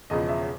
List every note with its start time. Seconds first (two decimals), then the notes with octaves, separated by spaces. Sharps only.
0.10 E1 E2 C#3 F3 D#5
0.29 E5